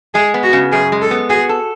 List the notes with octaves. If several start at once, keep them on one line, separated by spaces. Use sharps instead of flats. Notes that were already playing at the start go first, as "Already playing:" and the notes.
G#3 G#4
B3
F#4
C#3
F#2 G#4
G#3
A4
B3
F#4 G#4
A4